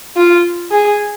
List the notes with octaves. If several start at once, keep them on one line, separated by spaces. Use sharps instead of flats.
F4
G#4